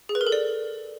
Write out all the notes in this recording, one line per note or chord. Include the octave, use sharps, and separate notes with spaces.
G#4
B4
A#4
A4
D5